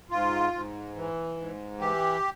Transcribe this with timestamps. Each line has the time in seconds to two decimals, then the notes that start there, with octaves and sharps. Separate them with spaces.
0.11 G#2 F4
0.53 G#2
0.96 E3
1.37 G#2
1.79 E3 G4